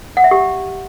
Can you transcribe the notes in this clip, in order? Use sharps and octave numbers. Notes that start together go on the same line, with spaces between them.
F#5
E5
G4